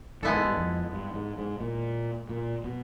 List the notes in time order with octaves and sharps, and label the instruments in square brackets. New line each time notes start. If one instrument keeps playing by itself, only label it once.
[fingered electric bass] G2 [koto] G#3 B3 E4 A4
[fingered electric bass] G#2
G2
F2
G2
G#2
G#2
A#2
A#2
B2